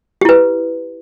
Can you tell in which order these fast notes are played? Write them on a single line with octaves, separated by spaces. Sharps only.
G4 E4 B4